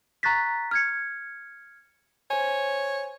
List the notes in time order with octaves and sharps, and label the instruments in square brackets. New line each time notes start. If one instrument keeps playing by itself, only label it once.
[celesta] A#5 C#6 F#6 A6 B6
F6 G#6 C#7
[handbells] C5 G#5 [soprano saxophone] C#5